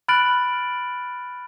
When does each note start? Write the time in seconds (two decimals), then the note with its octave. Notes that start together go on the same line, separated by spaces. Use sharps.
0.08 B5 F6 F#6 A6 D7 F#7